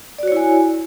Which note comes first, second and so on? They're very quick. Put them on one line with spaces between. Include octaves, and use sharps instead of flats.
D5 F#4 C#5 E4 G#5